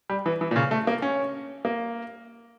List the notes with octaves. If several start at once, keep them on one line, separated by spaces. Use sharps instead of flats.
G3
E3
E3
A#2
C#3
A3
A#3
C#4
A#3